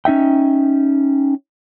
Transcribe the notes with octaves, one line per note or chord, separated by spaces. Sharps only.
C#4 D#4 E5 G5